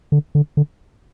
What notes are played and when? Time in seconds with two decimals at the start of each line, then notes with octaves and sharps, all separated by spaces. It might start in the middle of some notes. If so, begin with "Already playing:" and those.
0.12 D3
0.35 D3
0.57 D3